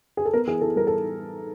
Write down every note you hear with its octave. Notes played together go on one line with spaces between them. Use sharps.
G#4
A4
B3 A#4
E3 G#4
E3 A4
G3 A#4
A4